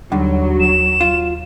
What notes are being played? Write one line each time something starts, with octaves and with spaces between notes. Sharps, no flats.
D#2 D3 F#3 G3
E7
F4